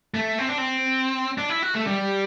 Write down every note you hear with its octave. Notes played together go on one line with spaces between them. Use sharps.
A3
C4
D4
C4
D4
E4
F#4
A3
G3